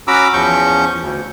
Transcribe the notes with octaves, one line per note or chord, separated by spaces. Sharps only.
C#4 F#4 A#5 B5 D6 E6
E2 F3 C#4 C#6 G6
D2